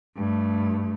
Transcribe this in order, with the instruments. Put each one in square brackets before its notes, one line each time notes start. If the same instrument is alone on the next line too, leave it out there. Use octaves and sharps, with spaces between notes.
[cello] G2 A3